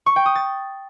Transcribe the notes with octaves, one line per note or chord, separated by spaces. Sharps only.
C#6
G5
D#6
A6